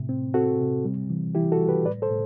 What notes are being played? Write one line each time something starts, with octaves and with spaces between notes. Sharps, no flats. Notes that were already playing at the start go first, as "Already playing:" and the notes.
Already playing: A2 C3
C4
C4 F#4 A4
C3
G3
E3
E3 E4 G4
F#4 A4
G3
G4 B4
A2 B4 D5
A4 C5
A2